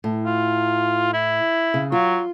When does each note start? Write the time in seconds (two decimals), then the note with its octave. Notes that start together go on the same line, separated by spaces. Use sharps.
0.04 A2
0.26 F4
1.14 E4
1.74 C#3
1.92 F#3 F4